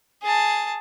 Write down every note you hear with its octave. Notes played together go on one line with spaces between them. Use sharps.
G#4 A5